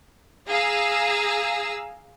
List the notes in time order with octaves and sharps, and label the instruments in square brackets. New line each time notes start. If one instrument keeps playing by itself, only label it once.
[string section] G#4 F5 A#5 E6